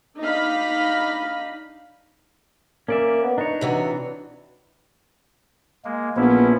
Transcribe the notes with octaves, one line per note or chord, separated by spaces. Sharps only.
D4 D#4 D#5 F5 B5
A#3 C#4 D5 E5
B3
D4 D#4 C#5
C3 E3 F#4
G#3 A#3
A#1 F3 B3 C#4 E4